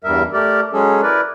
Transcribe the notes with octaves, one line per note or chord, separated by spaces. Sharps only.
E2 G2 G3 A#4 E5
A3 G4 A#4 D5
F#3 G#3 C#4 G#4 A4
E4 A#4 B4 D5